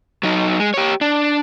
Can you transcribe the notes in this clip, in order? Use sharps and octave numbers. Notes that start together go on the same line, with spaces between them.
F#3 D#4
G#3
G4 C#5
D4